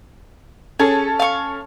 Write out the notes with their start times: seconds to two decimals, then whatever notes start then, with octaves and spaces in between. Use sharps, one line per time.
0.79 C#4 G#4 A4 A5
1.19 F5 C#6